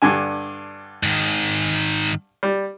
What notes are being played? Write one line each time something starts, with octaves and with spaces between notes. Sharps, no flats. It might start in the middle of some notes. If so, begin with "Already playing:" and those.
G2 D3 G#5
G#2 D#3
G3